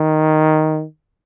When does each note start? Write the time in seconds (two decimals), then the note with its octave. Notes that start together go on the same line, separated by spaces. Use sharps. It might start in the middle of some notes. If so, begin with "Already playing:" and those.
Already playing: D#3